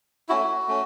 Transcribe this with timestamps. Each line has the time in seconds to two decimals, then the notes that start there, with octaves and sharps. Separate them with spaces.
0.29 A3 C#4 E4 F#4
0.68 A3 C#4